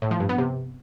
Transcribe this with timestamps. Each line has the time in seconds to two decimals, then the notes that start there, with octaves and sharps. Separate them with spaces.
0.02 A2
0.11 F3
0.20 G2
0.29 B3
0.38 C3